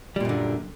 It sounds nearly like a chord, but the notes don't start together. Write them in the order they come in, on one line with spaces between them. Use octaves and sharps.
G3 A#2 F#2 D3